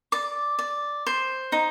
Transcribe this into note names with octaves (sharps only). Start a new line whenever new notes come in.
D5 D6
D5
C5
D#4